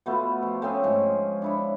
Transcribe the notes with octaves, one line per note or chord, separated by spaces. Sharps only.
B2 A3 B3 F4
F3
A3 C4 C#4 G#4
G#2 F3 G#3
D4 E4 C#5